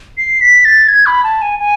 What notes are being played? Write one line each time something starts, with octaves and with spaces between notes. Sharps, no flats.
C7
B6
A6
G#6
B5
A5
G#5
G#5